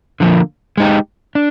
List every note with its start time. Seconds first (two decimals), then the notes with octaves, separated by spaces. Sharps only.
0.20 D3 F3 A#3
0.77 G#3 D#4 G4
1.35 D4